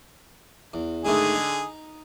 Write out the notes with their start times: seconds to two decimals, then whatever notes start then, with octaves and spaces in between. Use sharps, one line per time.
0.74 E2
1.05 G#2 D3 D#3 A3 G#4 D#6
1.34 D#4